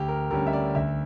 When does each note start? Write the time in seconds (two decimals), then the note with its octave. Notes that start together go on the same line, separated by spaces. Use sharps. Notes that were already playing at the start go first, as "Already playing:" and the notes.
Already playing: D2 G4
0.09 A#4
0.31 D3 G3 C#4 A#4
0.46 E5
0.53 D5
0.75 D2 E5